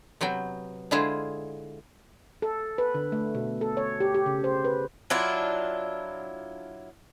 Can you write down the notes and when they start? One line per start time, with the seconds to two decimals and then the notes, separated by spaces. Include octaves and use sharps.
0.21 C3 F#3 B3 G5
0.91 D3 G#3 E4 F4 G#4 C5
2.42 A4
2.78 B4
2.94 D3
3.12 A3
3.35 B2
3.61 A4
3.77 C#5
4.00 G4
4.15 G4
4.26 C#3
4.44 C5
4.65 B4
5.10 F#3 D4 E4 F4